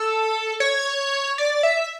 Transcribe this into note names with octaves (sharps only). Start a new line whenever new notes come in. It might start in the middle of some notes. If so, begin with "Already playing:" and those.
Already playing: A4
C#5
D5
E5